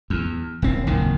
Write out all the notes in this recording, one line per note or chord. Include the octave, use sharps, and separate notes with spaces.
E2
D#1 C4
F#1 D#2 A#2 D#3